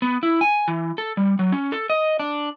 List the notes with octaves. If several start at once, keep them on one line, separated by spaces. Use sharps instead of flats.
B3
E4
G#5
E3
A4
G3
F#3
C#4
A4
D#5
D4